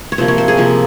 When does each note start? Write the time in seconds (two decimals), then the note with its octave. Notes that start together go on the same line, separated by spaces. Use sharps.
0.12 C#5
0.18 C3 F3 A#3 C5
0.28 C#5
0.38 C5
0.48 G#4
0.57 C3 F3 A#3